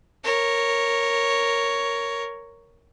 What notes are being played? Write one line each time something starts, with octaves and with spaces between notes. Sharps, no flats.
A#4 C#5